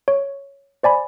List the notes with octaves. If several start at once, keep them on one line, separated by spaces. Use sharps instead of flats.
C#5
C5 D5 G#5 B5